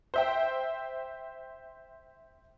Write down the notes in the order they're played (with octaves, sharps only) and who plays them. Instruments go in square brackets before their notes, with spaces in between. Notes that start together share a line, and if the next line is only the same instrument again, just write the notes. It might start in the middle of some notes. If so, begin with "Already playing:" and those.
[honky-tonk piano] C5 E5 G5